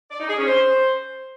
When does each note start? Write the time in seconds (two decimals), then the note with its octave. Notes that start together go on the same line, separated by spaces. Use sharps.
0.11 D5
0.20 D#4
0.29 G#4
0.38 C#4
0.47 C5